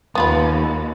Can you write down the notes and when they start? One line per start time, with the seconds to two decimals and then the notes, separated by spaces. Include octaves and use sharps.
0.15 D#2 B3 F4 B4